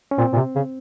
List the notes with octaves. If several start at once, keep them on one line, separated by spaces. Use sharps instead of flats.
C#4
A#2 C4
A#2
C3
C#3